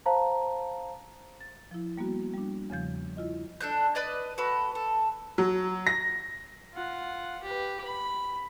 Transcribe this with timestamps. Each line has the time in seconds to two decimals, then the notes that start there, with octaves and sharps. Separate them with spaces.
0.06 C5 F5 A5 A#5
1.40 A6
1.71 F3 E4
1.98 G3 A#3 B3 F#4
2.33 G3 D4
2.70 E2 C#3 F3 G6
3.17 E4 F4 D#5
3.61 D4 A4 F#6 G6
3.95 B4 D5 D#5
4.38 F#4 A4 B4 B5
4.75 A4
5.38 F#3
5.87 A#6
6.74 F4 F#5
7.43 G4 B4
7.84 B5